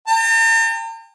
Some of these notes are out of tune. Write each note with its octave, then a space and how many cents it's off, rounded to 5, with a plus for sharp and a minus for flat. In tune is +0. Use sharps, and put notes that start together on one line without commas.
G5 +40 A#5 -45